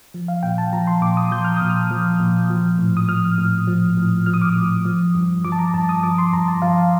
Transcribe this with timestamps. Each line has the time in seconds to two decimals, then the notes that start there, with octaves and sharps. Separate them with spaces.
0.14 F3
0.28 F5
0.43 A#2 G5
0.58 A5
0.73 F3 A#5
0.87 C6
1.02 A#2 D6
1.17 D#6
1.32 F3 G6
1.44 F6
1.57 A#2 D#6
1.70 F6
1.91 F3
2.20 A#2
2.50 F3
2.79 A2
2.97 D#6
3.08 F3 F6
3.38 A2
3.67 F3
3.97 A2
4.26 F3 F6
4.34 D#6
4.41 D6
4.49 D#6
4.56 A2
4.85 F3
5.15 G2
5.45 F3 D6
5.52 A5
5.59 A#5
5.74 G2 A5
5.89 D#6
6.03 F3 D6
6.18 C6
6.33 G2 A#5
6.48 A5
6.62 F3 F5